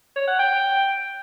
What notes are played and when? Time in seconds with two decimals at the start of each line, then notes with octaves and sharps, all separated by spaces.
0.16 C#5
0.28 F#5
0.39 G5